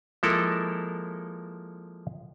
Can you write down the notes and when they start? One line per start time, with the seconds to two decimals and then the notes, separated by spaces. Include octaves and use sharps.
0.23 F3 G#3 A#3 E4 A4 A#4